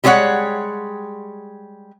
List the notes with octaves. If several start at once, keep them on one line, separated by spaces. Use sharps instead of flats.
G3 G#3 F#4 B4 C#5 F#5